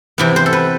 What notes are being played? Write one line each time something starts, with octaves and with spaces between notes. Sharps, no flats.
C3 E3 B3
C5
A4
B4